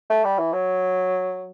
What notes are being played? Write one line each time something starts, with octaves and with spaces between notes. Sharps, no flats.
A3
G3
E3
F#3